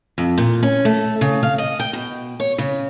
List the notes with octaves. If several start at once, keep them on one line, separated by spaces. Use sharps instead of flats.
F2
A#2
C#4
A3
C#3
F5
D#5
G5
B2
C#5
C#3